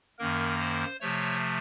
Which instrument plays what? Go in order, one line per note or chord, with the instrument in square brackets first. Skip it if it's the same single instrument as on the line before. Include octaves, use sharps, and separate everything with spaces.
[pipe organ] F#2 D#3 A#3 A#4
C5
C3 F3 A3 C#5